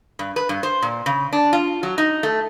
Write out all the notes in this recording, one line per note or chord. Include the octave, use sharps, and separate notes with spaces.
G2
B4
G2
C5
A#2
C#3
D4
F4
F#3
D#4
A3